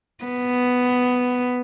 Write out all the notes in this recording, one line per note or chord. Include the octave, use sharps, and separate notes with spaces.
B3